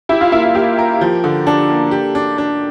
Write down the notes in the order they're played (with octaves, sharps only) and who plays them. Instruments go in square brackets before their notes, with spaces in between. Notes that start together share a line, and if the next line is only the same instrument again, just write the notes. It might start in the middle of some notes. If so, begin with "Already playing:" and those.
[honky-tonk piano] E4 [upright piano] G4
[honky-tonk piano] F4
[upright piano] A#3 [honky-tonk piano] E4
[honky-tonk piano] E4
[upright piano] A#3 [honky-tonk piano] G4
[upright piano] A#4
F3
D3
[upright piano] D4 [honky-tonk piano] A4
[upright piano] A#3
G4
D4
D4